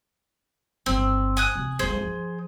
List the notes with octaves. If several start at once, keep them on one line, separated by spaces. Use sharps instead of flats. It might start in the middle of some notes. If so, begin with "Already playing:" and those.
G1 C4 D4
G#5 D#6 F#6
C3
G1 G2 G#4 C5
F3